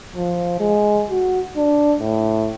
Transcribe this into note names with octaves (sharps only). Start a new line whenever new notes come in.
F3
G#3
F#4
D4
A2